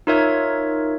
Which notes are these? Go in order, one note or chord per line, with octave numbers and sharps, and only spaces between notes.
D#4 F4 A#4 C#5 E5 G#6